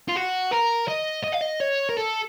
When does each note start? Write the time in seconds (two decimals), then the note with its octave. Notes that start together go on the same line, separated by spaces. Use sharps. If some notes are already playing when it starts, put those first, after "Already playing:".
0.08 F4
0.16 F#4
0.51 A#4
0.88 D#5
1.24 D#5
1.33 F5
1.42 D#5
1.61 C#5
1.90 A#4
1.97 A4